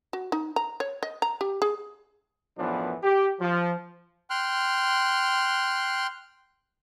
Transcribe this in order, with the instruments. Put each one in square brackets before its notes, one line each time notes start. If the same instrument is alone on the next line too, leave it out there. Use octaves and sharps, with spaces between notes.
[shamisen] F#4
D#4
A#5
C#5
D#5
A#5
G4
G#4
[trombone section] F#2 A2 E3 F3 B3 D4
G4
F3
[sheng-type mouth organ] G5 C6 F6 F#6